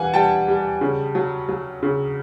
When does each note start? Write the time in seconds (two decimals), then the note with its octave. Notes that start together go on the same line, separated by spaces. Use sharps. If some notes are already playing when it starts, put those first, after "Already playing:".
Already playing: E3 G3 F5 F#5 G#5
0.14 G3 G5 A5
0.48 G3
0.81 C#3
1.15 F#3
1.49 F#3
1.83 C#3